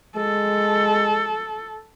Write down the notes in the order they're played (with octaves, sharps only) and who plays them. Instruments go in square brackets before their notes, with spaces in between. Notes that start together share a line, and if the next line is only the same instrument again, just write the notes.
[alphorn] G#3 [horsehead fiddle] A4